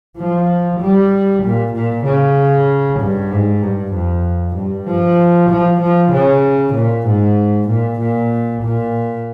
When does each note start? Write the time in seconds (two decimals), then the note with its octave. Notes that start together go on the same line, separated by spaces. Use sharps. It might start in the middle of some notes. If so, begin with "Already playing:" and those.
0.17 F3
0.80 G3
1.43 A#2
1.75 A#2
2.05 C#3
3.00 G2
3.31 G#2
3.62 G2
3.94 F2
4.56 G2
4.87 F3
5.50 F3
5.81 F3
6.13 C#3
6.75 A#2
7.07 G#2
7.69 A#2
8.00 A#2
8.63 A#2